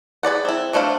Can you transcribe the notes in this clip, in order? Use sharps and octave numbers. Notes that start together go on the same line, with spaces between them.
G#4 B4 D5 F#5
C4 E4
F#3 A3 D4 C5 F5